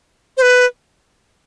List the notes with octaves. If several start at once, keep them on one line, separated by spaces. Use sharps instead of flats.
C5
B4